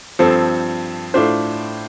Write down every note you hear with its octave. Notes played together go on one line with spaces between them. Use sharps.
G2 F3 C4 A4
A2 A3 D4 F4 C5